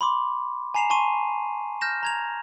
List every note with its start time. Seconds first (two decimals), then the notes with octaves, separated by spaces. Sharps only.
0.01 B5 C6 D6
0.74 G#5 A#5 C7 E7 F7
0.90 G#5 A5 C6 C#6 D#7
1.81 F6 G6 A#6 E7
2.03 A#5 G#6 F7